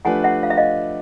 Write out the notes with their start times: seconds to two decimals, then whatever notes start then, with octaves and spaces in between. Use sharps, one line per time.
0.05 F3 A3 D4 G4 B4 F#5 G#5
0.24 E5 F#5
0.43 F5
0.50 E5
0.57 D#5 F5